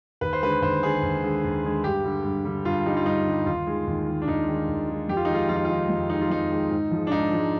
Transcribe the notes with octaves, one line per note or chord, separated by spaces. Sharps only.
D#2 B4
C5
D3 G#3 B4
D#2 C5
D3 G#3 G#4
D#2
D3 G#3
D#2
D3 G#3
G2 G4
D3 G3
G2
D3 G3
G2 F4
D3 G3 D#4
F4
G2 D#4
D3 G3
D#2 F4
D#3 G#3
D#2
D#3 G#3
D4
D#2 D#4
D#3 G#3
D#2
D#3 G#3
F2 G4
F4
D#4
D#3 G#3 F4
F2 F4
D#4
F4
D#3 G#3
F2
D#3 G#3 D#4
F4
F2 D#4
D#3 G#3
G#2
F3 G#3
D4
G#2 D#4
F3 G#3